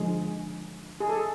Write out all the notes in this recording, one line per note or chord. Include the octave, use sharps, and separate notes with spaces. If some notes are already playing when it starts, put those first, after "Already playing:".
Already playing: D3 F3 G#3 G#4
G#4
A4